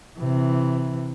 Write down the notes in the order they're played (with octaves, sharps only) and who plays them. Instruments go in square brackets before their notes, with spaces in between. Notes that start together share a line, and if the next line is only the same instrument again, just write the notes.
[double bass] C3 E3